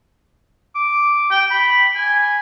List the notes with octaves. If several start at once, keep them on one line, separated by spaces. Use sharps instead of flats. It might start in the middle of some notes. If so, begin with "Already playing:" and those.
D6
G5
B5
G#5